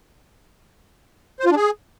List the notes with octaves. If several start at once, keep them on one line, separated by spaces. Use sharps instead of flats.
C5
F4
D4
G#4